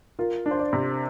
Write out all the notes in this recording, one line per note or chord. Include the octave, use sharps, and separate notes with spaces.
F4 A#4
D4
C5
D5
C3